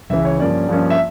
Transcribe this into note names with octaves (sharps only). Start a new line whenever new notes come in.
C#2 C#3 E3 E5
C#5
G2 F3 A#3 C#4 D5
G2 F3 A#3 C#4
E5